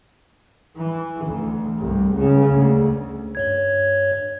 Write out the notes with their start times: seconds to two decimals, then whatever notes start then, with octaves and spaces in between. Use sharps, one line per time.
0.77 E3
1.26 D2
1.77 C2 G2
2.13 C#2 C#3
2.50 D2
3.35 G2 C#5 G#6